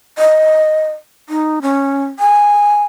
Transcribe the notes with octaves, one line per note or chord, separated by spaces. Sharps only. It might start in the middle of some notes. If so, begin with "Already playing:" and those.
D#5
D#4
C#4
G#5